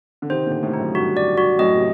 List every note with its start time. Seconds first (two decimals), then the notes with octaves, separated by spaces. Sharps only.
0.22 D3
0.30 C3 D#3 C5
0.46 A#2 D3
0.52 C5
0.62 A2 C3
0.73 D#4
0.79 F#2 A2
0.94 G2 F#4
1.17 D5
1.37 F#4
1.59 F#2 A2 D#5
1.76 C3